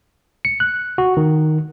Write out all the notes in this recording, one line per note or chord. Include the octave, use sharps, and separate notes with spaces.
C#7
F#6
F#4
D#3